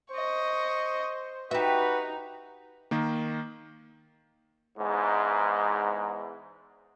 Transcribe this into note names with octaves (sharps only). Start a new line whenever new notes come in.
C5 D#5 C#6
D#4 F#4 G4 B4 E5
D#3 A#3
E2 G#2